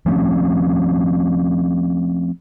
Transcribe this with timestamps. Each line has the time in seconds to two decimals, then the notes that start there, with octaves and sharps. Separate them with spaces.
0.06 F3 A3 C4 C#4